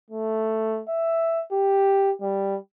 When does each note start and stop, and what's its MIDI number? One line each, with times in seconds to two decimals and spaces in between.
0.10 0.82 57
0.89 1.43 76
1.52 2.12 67
2.22 2.57 55